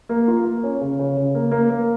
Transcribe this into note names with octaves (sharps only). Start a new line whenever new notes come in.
A#3
F4
A#3
C#4
C#3
C#3
C#3
A#3
A#3
A#3